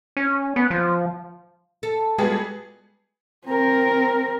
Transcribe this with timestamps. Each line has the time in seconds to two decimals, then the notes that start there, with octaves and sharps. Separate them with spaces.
0.17 C#4
0.56 B3
0.70 F3
1.83 A4
2.18 G3 G#3 B3 F4 F#4 G#4 A4
3.46 C4 A#4